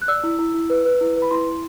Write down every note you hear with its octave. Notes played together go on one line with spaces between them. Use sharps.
F#6
D5 E6
E4
E4
E4
B4
B4
E4
B4
B5
E4 C6
E4